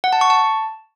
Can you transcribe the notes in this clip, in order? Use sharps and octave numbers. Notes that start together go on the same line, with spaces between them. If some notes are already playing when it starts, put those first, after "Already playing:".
F#5
A5
C#6
A5